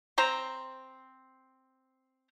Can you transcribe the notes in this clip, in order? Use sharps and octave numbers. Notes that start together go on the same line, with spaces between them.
C4 C5 A#5